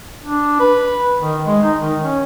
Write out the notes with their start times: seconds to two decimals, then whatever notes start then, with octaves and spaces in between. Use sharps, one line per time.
0.25 D4
0.60 B4
1.21 D#3
1.46 G#3
1.62 D#4
1.81 D#3
2.02 C#4